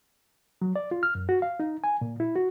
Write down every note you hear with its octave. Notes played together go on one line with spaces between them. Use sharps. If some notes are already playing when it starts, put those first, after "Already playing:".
F#3
D5
F4
F6
F#2
F#4
F5
D#4
G#5
A#2
E4
F#4